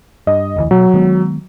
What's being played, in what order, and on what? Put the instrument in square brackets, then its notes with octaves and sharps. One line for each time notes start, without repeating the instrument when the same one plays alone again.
[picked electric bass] G2 [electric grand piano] D#5
[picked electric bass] F1 D2 E3
[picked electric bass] B2 [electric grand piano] F#3
[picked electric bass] D#3 G#3 B3